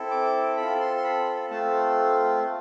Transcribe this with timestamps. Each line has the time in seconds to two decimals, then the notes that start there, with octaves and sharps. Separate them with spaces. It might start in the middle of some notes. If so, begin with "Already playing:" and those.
Already playing: C4 E4 A4
0.10 D6
0.57 C4 F4 A4 B5
0.80 C6
0.97 C6
1.04 B5
1.50 A3 C4 F4 A5